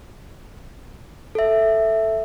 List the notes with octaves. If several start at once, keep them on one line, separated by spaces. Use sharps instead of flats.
A4 E5